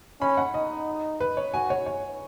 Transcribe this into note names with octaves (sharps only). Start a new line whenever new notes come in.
C#4 B5
F#5
D#4 D#5
B4
C#5
F#4 G#5
C#5
C#5